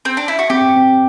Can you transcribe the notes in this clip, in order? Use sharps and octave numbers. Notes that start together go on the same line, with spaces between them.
C4
D4
E4
F#4
C4 G4
C4